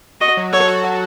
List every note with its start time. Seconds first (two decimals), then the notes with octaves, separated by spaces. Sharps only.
0.21 F#4 D#5
0.37 F#3
0.53 A4 C#5
0.68 F#4
0.84 F#3